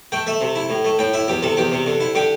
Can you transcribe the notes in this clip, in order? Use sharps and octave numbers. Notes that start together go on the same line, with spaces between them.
A3 G5
A3 E5
C3
E4
A2
A3
A2 G5
E4 E5
E2 G4
C3 A4
E2 G4
C3
D3
E4
D3 G4